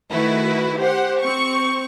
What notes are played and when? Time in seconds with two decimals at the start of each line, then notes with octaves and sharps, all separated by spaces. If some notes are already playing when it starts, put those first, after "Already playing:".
0.11 D#3 A3 E4 F#4 B4
0.78 G4 C5 F#5
1.21 C4 C#6